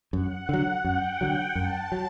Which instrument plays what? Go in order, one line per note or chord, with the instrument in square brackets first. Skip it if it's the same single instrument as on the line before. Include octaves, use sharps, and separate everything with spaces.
[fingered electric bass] F#2 [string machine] F#5
[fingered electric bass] D3 F#3
[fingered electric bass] F#2 [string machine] G5
[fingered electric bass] D3 F#3
[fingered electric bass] F#2 [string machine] A5
[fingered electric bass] F#3